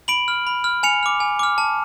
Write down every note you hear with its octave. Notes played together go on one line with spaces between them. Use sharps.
B5 D7 F#7
F6
B5
F6
G#5 C#7 F7
D6 F6
G#5
D6 F6
A5